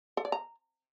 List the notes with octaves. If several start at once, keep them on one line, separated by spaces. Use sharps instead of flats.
A4
D5
A#5